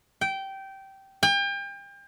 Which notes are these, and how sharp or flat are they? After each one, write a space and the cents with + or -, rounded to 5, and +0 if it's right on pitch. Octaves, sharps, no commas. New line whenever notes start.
G5 -15
G5 +35